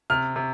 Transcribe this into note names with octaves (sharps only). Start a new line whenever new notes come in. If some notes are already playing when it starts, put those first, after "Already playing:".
C3 F6
C3